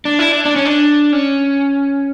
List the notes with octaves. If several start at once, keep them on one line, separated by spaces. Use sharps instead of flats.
D4
E4
D4
D4
C#4
D4
C#4